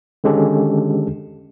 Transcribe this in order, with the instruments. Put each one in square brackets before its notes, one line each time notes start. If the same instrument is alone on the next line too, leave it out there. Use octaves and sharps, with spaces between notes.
[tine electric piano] D3 D#3 G#3 C#4 G4 A4